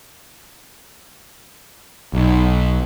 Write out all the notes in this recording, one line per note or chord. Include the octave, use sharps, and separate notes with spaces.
B1